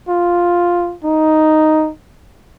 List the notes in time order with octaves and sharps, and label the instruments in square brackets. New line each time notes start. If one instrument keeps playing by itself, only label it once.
[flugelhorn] F4
D#4